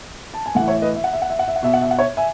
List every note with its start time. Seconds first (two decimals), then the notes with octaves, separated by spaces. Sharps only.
0.34 A5
0.46 G#5
0.55 A2 E3 F#5
0.68 C#5 E5
0.82 B4 D#5
0.96 E5
1.04 F#5
1.13 E5
1.22 F#5
1.30 E5
1.39 F#5
1.48 E5
1.56 F#5
1.63 B2 E5
1.74 F#5
1.82 E5
1.91 F#5
1.99 C#5 E5
2.17 E5 G#5